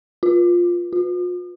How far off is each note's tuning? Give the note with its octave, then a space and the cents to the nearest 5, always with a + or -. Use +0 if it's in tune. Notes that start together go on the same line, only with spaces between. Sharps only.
F4 +5
F4 +40